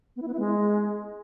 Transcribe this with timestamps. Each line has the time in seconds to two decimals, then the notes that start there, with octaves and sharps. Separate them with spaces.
0.16 B3
0.22 E4
0.28 B3
0.33 E4
0.39 G#3